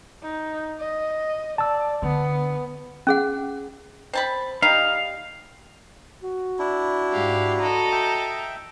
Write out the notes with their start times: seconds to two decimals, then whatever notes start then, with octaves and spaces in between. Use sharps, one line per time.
0.23 D#4
0.80 D#5
1.58 D5 A5 E6
2.02 D3 B3
3.07 C#4 G#4 F#5
4.13 C4 A5 B5
4.62 G3 D#4 F5
6.22 F#4
6.59 D4 E4
7.12 G#2 G4 F5
7.60 A4 D#5 A#5
7.92 E5 G5